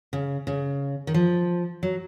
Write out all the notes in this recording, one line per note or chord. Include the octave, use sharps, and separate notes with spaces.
C#3
C#3
D#3
F3
F#3